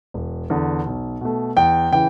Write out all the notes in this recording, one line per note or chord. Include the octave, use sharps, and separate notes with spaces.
E1
E2 D3
B1
B2 A3
E2 G5
C#3 E3 G5